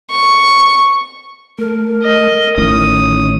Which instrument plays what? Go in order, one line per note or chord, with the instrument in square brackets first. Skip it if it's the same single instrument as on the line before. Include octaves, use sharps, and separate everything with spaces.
[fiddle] C#6
[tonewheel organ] A3 [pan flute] A#4
[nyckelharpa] D#5
[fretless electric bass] A1 A2 [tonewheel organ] D#3 C#4 [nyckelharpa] D#6